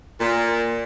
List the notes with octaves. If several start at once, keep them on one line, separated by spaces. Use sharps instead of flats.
A#2